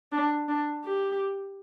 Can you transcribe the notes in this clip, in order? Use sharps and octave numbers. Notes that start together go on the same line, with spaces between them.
D4
D4
G4